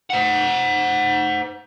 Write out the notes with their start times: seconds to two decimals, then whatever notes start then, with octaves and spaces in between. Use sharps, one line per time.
0.10 C5 F#5